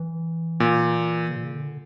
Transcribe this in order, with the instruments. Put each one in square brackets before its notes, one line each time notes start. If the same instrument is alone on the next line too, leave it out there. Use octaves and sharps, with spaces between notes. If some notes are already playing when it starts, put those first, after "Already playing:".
Already playing: [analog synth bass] E3
[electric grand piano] A#2
[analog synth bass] C#3
A#2
C#3
D3